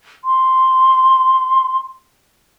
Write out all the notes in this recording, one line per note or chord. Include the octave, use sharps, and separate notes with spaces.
C6